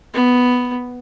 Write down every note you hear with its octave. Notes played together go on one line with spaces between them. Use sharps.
B3